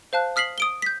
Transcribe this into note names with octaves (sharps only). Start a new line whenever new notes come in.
C5 F5 A5 F#6
D#6 F6 B6 C7 F#7
D#6 D7 G7
G6 B6